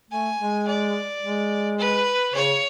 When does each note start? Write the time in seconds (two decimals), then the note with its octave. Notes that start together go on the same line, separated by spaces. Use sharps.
0.11 A3 G#5
0.40 G#3
0.67 D5
1.22 G#3
1.79 B4
2.34 C#3 C#5